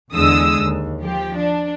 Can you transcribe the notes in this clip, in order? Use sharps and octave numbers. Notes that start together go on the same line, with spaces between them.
E2 D3 G#3 D#6 E6
D#2
F3 G4
D4